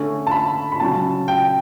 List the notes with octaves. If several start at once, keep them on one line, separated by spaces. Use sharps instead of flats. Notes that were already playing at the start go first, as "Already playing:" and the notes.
Already playing: D3 A3 C#4
A5
B5
B5
C#3 F#3 C#4 A5
G5